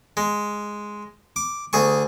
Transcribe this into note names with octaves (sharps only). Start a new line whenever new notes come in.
G#3
D6
D2 G#4 G#5 C#6